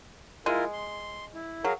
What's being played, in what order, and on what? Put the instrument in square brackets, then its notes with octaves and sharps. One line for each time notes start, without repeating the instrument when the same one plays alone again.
[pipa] G#3 [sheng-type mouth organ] E4 F4 A#4
[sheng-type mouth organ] C6
E4
[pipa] F#3 [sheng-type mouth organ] G#4 A#4 F5